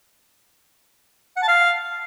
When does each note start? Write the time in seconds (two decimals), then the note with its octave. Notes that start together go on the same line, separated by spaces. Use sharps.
1.36 F#5
1.42 A5
1.48 F5